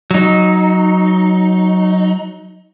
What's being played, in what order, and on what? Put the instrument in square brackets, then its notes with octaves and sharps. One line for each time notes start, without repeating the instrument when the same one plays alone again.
[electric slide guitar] F#3 D#4